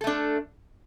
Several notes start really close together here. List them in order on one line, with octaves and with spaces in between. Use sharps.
A4 A3 D4